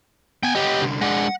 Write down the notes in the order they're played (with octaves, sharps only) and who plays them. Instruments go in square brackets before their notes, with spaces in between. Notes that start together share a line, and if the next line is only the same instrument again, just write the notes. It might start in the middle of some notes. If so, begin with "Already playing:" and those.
[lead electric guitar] B3 [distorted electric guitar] G5 G#5
[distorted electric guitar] B3 G4 [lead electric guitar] C#5 D#5
[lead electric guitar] C2 D3
[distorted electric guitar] G#3 D4 [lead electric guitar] F#5